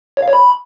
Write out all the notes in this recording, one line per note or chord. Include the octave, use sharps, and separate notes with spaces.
C#5
F5
C#5
B5